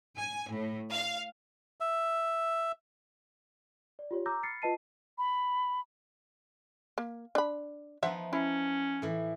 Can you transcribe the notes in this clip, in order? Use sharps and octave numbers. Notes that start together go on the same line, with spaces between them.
G#5
A2
F5
E5
D5
F4 G4 C#5
A#5 D6 E6 G6 A#6
B5 F6 A6 C7 C#7
F4 B4 D#5 A5 C7 D#7
B5
A#3
D4 B5
F3 B3 D#4 C5 E5 F#5
C#4 E4
A2 E3